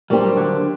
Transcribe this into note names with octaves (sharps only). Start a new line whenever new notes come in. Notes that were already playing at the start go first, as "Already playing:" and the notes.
F#3 G3 A#3 D4 G4 C5
D3